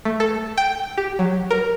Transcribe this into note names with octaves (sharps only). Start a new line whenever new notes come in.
A3
A4
G5
G4
F#3
A#4